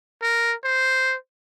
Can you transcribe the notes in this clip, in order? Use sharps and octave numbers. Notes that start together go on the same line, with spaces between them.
A#4
C5